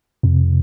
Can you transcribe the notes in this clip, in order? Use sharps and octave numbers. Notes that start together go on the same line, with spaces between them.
F2 C3